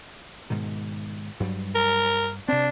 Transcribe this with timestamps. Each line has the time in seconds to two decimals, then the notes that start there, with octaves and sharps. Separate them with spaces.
0.50 G#2 B2 D#3
1.40 G2 F#3 G3
1.75 A#4
2.48 C3 C4 D4